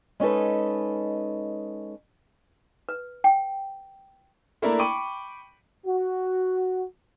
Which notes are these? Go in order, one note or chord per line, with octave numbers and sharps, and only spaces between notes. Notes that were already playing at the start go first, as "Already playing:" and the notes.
G#3 C#4 D#4 A4 B4
B4
G5
A3 A#3 D4 E4 A#4
G5 B5 C#6 D6 D#7 F#7
F#4